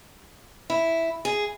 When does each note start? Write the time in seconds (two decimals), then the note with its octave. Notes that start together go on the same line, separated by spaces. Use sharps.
0.70 E4
1.25 G#4